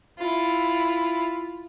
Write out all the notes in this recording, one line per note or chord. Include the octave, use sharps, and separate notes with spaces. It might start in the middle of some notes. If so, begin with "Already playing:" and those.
E4 F4